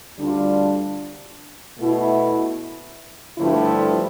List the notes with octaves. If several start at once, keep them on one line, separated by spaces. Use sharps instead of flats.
D2 D3 G3 D4 F4
B2 A3 E4
G2 D3 F3 A3 E4